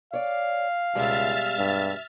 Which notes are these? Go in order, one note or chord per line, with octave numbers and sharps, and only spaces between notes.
C#5 D5 F5
C#2 B2 G3 G#3 E5 F6 A6
G2